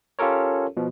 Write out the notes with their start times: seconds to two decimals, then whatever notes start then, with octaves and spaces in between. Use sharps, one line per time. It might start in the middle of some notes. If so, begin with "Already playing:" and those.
0.19 C#4 F4 G4 A4 A#4 C#5
0.77 B2 F3